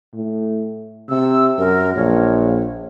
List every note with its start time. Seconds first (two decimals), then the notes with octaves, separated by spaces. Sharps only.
0.14 A2
1.09 C3 E6
1.58 F#2 A#4
1.96 A#1 C#5